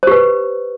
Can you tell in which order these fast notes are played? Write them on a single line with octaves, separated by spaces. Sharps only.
C5 G4 B4